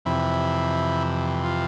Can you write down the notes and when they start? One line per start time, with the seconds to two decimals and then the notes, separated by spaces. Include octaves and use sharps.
0.05 F2 C3 E3 E4
1.44 F4